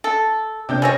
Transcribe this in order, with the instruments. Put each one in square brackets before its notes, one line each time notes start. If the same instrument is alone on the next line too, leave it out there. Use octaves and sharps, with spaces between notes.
[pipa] A4
[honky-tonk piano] C3 D4 G6
[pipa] G3 G#3 C#5 [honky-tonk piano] G#5 E6 A#6